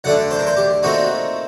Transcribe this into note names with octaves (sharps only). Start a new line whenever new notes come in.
D2 D3 A3 D4 F#5
C5
A#4
C5
G4
A#2 A3 C4 D#4 F#4